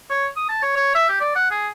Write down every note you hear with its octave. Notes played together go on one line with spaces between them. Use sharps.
C#5
D#6
A5
C#5
C#5
E5
G4
D5
F#5
G#4